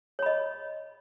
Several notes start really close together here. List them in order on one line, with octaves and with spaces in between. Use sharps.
C#5 B5 D#5